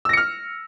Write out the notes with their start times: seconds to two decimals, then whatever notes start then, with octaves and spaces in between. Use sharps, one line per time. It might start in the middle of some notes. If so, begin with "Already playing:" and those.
0.05 E6
0.09 A#6
0.13 C#7
0.17 F6